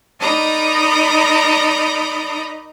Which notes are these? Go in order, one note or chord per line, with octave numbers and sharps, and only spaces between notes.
D#4 A#4 D5 D#5 A#5 B5